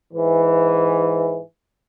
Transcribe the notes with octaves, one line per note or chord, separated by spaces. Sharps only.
G#2 E3